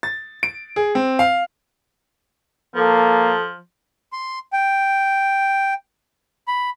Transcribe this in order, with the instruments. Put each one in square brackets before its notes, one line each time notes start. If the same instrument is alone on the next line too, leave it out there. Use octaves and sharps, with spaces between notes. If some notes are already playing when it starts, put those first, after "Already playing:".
[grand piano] A6
D7
G#4
C4
F5
[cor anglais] F3 [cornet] A#3 [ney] A4
[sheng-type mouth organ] C6
G5
B5